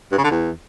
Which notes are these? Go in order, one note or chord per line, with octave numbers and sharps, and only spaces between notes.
G2
C#3
D3
E2